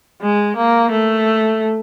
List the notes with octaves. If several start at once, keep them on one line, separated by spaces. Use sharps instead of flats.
G#3
A#3
A3